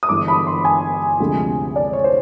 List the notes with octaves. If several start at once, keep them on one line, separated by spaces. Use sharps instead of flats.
D#6
G1 G2 E3 G#3 D6
B5
C6
G#5
D2 C3 F3 G#3
D5
C#5
C5